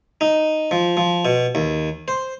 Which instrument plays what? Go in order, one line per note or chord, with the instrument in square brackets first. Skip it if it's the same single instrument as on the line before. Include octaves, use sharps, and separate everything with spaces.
[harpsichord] D#4
F3
F3
B2
D#2
C5